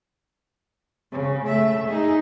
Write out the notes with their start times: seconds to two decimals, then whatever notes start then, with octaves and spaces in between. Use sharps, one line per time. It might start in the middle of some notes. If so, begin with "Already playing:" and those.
1.12 C#3
1.44 A3 E5
1.88 D#4 G#4